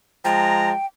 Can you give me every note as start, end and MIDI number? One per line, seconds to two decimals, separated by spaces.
0.24 0.72 53
0.24 0.72 56
0.24 0.86 79
0.24 0.72 82